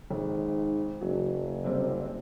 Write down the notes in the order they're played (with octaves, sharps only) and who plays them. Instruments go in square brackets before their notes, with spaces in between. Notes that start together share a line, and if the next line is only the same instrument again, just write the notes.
[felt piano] G#1 [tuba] G#2
[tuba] F#1 [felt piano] F#3
[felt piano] C3 G3 C4